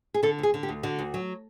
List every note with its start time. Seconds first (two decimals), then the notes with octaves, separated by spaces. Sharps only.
0.14 G#4
0.23 D3 A4
0.38 D2 G#4
0.54 D3
0.63 G4
0.69 D2
0.83 D3 F#4
0.99 D2
1.14 F#3